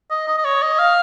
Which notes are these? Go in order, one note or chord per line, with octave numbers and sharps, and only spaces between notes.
D#5
D#5
D#5
C#5
D#5
F5